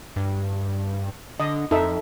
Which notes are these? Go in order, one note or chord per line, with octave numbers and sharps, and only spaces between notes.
G2
D3 D#5
F2 D#4 A4 E5